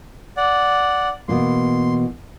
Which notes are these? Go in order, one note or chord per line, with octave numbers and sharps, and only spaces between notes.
D5 F#5
B2 E3 A#3 C6